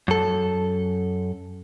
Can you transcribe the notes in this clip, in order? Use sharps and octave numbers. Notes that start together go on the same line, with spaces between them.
F#2 A4